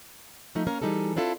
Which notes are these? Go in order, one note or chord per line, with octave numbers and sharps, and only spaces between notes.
F3 A3 D#4
A#3 C#4 A#4 F5
E3 G3 D#4 G#4 A4
C4 D4 E4 F4 A4